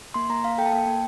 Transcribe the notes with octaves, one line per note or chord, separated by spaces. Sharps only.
A#3 C6
A#3 A#5
A#3 F5
A4 G5
A5
A#3 G5
A#3